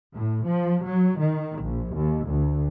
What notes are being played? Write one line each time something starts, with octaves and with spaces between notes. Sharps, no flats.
A2
F3
F#3
D#3
A#1
D#2
D2